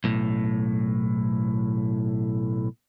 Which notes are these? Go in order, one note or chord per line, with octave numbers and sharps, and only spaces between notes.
B1 A2